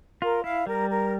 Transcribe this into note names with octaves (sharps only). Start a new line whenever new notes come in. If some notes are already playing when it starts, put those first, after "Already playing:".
F4 A#4
E4 F5
G3 A#4
A#4